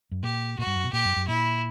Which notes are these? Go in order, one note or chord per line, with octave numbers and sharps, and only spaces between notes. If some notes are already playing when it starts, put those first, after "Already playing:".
F#2
A#2 G4
A#2 F#4
G2
F#2
B2
A#2 G4
F#2
F#2
A#2 E4